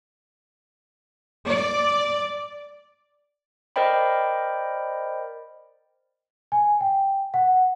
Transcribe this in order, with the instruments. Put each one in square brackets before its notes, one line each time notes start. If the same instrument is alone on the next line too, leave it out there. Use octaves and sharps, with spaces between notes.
[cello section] D5
[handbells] A#4 C5 D5 D#5 G5 B5
[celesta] G#5
G5
F#5